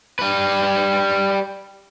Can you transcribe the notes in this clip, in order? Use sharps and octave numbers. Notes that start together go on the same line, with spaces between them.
G3 B4